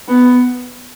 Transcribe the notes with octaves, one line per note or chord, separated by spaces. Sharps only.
B3